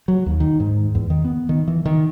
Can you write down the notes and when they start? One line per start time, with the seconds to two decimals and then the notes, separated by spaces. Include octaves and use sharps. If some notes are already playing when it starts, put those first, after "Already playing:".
0.08 F#3
0.26 D#2
0.40 D#3
0.60 G#2
0.95 E2
1.10 D#3
1.25 B3
1.49 D#3
1.68 E3
1.85 D#3